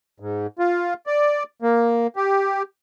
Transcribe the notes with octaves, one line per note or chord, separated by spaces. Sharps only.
G#2
F4
D5
A#3
G4